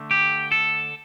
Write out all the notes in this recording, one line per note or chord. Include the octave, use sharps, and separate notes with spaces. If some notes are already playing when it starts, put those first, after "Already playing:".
Already playing: D3 A3
G4
A4